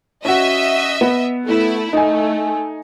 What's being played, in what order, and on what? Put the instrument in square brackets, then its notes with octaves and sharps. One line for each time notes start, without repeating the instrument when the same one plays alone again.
[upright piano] C#4 F#4 [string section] D#5 E5
[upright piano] B3
[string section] A3 E4
[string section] A3 [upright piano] D#4 G#5